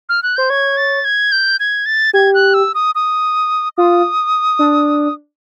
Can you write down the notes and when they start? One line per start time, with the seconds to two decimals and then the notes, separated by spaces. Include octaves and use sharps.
0.09 F6
0.23 F#6
0.36 C5 G6
0.50 C#5 G#6
0.77 A6
1.05 G#6
1.32 G6
1.60 G#6
1.86 A6
2.13 G4 G#6
2.34 F#6
2.54 E6
2.75 D#6
2.95 D#6
3.77 F4 D#6
4.59 D4